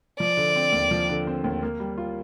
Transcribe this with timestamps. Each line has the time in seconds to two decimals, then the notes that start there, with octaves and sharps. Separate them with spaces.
0.20 F3 D5
0.37 D3
0.56 C4
0.72 D#2
0.91 F3
1.09 D3
1.27 C4
1.44 D#2
1.63 A#3
1.80 G3
1.98 F4